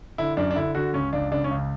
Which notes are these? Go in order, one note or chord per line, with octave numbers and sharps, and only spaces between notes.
D3 E4
F#2 D4
D4
D3 E4
D3 F#4
C#2 C#4
C#2 D4
C#3 D4
C#4
C#2